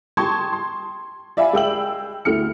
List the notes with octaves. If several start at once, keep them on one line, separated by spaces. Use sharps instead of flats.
G5 A5 C6 C#6 D#6 G#6
C6
D5 E5 F5 G#5 B5
G#3 G5 E6 F#7
D2 A3 E4 F6 C#7